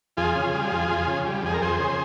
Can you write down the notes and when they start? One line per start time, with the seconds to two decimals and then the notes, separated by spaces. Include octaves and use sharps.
0.17 F2 F4 G#4
0.35 C#3
0.54 G3
0.72 F2
0.89 F2
1.07 C#3
1.26 G3
1.43 F2 G#4
1.54 A#4
1.62 F2 G#4 C5
1.79 C#3